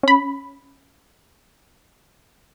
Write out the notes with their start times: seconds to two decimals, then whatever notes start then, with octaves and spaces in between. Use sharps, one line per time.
0.03 C#4 B5